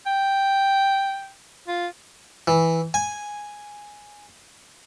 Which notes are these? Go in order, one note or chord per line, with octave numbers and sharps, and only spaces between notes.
G5
F4
E3
G#5